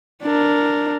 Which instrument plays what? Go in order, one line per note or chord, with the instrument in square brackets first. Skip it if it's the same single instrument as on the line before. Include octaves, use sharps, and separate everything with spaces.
[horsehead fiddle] D4 A#4